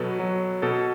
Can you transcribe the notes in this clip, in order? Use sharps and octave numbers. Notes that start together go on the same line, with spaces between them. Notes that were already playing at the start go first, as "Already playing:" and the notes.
Already playing: B2 F#3 F#4 A4 B4
F#3
B2 A4